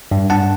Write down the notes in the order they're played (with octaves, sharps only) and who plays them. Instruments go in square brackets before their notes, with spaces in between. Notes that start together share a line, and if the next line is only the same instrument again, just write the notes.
[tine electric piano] G2
G2 F#5 A5